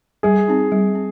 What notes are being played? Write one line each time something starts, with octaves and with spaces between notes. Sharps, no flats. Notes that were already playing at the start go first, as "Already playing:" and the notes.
G3 G#4
C4 D#4
G3
C4